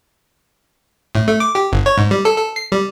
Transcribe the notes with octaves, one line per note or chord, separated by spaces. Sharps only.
A2
A3
D6
G4
G1
C#5
G#2
G3
A4
A4
C7
G3